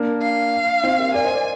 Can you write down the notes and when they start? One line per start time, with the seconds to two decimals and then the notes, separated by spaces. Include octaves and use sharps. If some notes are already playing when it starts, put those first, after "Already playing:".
Already playing: A#3 D4
0.22 F5
0.83 C4 D#4
0.99 G4 A#4
1.14 A#4 D5 G#5
1.25 C5 D#5
1.35 A#4 D5